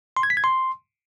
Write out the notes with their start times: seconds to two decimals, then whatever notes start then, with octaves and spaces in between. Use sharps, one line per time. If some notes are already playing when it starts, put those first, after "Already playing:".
0.17 C6
0.23 G#6
0.30 B6
0.37 G#6
0.44 C6